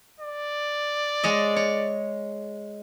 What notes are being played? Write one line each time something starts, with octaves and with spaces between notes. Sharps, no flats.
D5
G#3 C#5 D#5
C#5